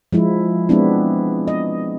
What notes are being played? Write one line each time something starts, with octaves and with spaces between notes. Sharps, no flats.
F3 G#3 E4
G#3 B3 C4 D4 E4
D#5